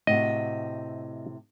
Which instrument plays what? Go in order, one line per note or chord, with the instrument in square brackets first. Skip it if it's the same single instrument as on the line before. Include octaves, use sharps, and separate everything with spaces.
[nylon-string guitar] A2 C3 F#4 [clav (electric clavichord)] D#5